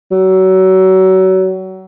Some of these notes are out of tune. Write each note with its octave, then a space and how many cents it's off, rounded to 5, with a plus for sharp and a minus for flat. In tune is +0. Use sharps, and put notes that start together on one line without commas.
F#3 +30